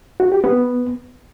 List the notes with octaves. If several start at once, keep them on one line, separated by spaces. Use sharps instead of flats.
F#4
G4
B3